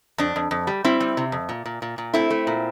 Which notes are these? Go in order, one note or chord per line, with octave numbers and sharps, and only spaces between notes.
F2 D4
F2
F2
G3
G3 C4 E4
G3
C3
F2
A#2
A#2
A#2
A#2
A3 C4 E4
A3
A#2